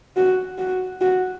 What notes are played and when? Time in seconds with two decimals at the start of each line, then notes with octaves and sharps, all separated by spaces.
0.17 F#4
0.58 F#4
1.01 F#4